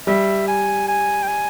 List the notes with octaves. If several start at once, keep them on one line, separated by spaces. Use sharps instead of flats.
G3 E5
G#5
G#5
G5
G#5